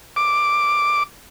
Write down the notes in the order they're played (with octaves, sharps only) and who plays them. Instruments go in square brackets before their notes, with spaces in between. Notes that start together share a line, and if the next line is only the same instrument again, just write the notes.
[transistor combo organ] D6